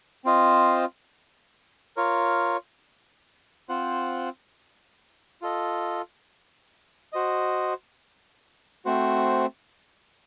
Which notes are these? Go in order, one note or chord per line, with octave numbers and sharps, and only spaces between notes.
C4 F4 C5 D#5
F4 A#4 C#5
C4 F4 C5 F#5
F4 A4 D#5
F#4 C5 D#5
A3 C4 F#4 C5